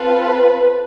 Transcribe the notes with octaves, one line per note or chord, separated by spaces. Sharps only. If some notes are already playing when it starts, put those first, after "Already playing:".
Already playing: C4 F4 A4 B4